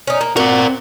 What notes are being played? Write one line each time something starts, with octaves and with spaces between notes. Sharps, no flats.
C#4 D#4
A#3
C4 F#4 A#4 D5